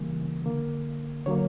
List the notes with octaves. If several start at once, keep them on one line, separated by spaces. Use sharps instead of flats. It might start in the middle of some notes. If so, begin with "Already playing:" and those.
Already playing: C#3 E3 G3 A#3
D3 A#3
D3 F#3 A#3 C#5